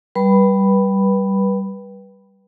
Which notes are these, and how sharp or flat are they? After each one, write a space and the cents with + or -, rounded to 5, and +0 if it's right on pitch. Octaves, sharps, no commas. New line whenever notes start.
G3 -10 B4 -20 B5 +0